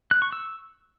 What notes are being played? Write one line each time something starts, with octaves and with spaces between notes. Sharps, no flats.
F#6
C#6
E6